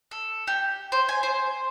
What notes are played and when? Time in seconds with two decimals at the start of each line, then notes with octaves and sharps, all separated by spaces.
0.11 A4
0.48 G4
0.92 C5
1.09 G#5
1.23 C5